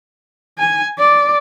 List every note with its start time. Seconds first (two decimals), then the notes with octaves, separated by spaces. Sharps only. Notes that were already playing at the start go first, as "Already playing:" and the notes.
0.58 G#5
0.99 D5